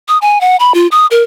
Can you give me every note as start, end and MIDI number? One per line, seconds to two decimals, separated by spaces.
0.08 0.18 87
0.22 0.41 80
0.41 0.56 78
0.60 0.72 83
0.74 0.87 65
0.91 1.06 87
1.11 1.23 70